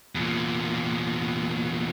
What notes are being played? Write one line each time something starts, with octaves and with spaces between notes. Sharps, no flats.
E2 A#2